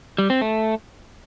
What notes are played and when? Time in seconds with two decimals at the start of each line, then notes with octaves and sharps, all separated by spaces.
0.18 G3
0.30 C4
0.41 A3